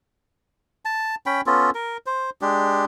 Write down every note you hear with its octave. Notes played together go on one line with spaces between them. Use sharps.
A5
C#4 G5 B5
B3 C#4 F4 A4
A#4
C5
G#3 D4 G4